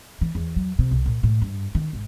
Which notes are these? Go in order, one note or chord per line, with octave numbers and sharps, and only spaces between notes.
E3
E2
F#3
C3
C2
A#2
A2
G2
D#3
G#1